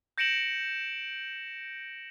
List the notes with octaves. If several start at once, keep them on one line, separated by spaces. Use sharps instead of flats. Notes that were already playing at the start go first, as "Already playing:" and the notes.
G6 A#6 C#7 D7 E7 F#7